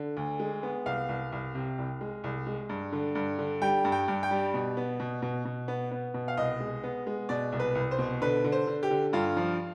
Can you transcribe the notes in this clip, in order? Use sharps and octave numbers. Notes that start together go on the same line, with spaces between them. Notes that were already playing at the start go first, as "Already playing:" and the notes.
Already playing: D3
D2
G#3
B3
C2 F5
C2
C2
C3
C2
G#3
C2
G#3
G2
D3
G2
D3
G3 G5
G2
G5
G2
G5
G3
B2
B3
B2
B2
B2
B3
B3
B2
F5
C2 D#5
G#3
B3
G#3
B2 D5
C2
B4
C2
C5
B2
D3 B4
D3
C5
D3
G4
D3
G2 F4
F3